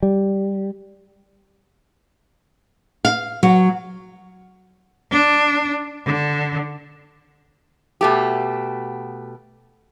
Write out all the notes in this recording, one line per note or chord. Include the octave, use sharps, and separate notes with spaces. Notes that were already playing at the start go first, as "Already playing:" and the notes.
G3
F5
F#3
D4
D3
B2 A3 G4